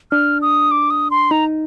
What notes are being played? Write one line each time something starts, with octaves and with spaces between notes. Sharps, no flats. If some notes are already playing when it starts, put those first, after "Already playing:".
D4 F6
D#6
D6
D#6
C6
D#4 A#5